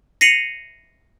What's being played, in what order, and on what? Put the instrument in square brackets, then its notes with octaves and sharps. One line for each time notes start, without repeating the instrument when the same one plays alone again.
[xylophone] A#6 C7 C#7 D#7 F7 F#7